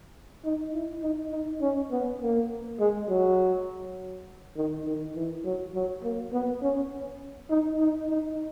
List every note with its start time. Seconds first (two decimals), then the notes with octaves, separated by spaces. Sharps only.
0.45 D#4
0.74 E4
1.02 D#4
1.32 D#4
1.61 C#4
1.91 B3
2.21 A#3
2.79 G#3
3.09 F#3
4.56 D#3
4.85 D#3
5.15 E3
5.44 F#3
5.74 F#3
6.03 A#3
6.33 B3
6.62 C#4
7.50 D#4
7.79 D#4
8.10 D#4